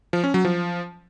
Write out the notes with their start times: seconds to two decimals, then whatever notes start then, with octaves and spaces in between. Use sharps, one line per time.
0.13 F3
0.24 C#4
0.34 F#3
0.45 F3